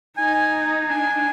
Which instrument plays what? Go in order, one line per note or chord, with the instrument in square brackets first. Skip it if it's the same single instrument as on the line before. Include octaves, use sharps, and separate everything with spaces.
[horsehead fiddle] D#4 [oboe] G#5
[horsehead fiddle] D4 [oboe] G#5